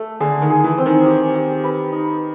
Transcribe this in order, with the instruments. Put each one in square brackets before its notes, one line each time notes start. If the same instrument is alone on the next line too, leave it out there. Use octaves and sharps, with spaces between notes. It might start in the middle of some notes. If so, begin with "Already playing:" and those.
Already playing: [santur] A3
[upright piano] D3 [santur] G#4
[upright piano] D#3
[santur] G#4
[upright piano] E3
[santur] C4
[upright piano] D#3
[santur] G4
G4
B4
D#4